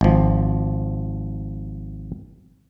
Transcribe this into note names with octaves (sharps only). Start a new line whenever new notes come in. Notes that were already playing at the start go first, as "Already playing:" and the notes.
G#1 F3